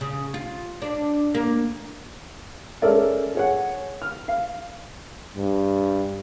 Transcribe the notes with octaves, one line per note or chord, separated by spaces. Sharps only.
C#3
F4
D4
A#3
G#3 C#4 A4 A#4 D5 E5
G#4 C#5 F#5
F6
F5
G2